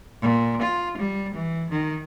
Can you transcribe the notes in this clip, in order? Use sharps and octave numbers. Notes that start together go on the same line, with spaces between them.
A#2
F4
G3
E3
D#3